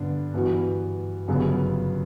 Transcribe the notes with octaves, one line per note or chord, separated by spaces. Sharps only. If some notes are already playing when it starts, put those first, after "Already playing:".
Already playing: G2 D3 B3 D4
G2 E3 B3 F#4
G1 F#2 C#3 G3 B3